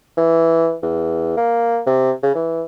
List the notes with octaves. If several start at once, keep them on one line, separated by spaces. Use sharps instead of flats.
E3
E2
A#3
C3
C#3
E3